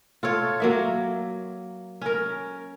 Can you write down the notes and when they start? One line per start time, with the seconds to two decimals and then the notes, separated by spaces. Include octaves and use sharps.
0.23 F4 A4 C#5
0.60 F#3 A#3 E5
2.01 C#4 A#4